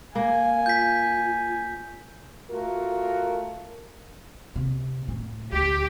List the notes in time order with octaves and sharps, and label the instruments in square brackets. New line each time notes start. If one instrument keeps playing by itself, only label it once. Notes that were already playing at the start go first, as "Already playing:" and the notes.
[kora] A#3 [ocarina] F5 [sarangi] G#5
[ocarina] F4 [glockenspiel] G6 B6
[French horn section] A3 F4 F#4 A#4
[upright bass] C3
A2
[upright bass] D2 [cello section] G4